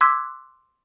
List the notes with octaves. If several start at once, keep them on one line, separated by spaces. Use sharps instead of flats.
C6 D6 E6 F#6 G#6 B6